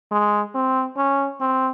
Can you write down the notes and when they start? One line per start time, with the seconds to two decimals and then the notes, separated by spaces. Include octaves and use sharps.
0.11 G#3
0.55 C4
0.97 C#4
1.41 C4